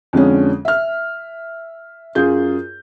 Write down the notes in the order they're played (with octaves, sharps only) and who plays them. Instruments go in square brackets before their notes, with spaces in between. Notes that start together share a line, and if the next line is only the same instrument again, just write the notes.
[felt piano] F2 D3 G#3 C#4
E5 F6
F#2 F4 G#4 G6